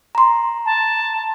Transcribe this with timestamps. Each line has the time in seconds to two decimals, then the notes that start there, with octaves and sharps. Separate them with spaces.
0.15 A#5 C6
0.66 A5